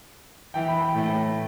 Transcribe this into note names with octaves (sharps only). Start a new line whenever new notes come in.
E3 G5
B5
G5
A2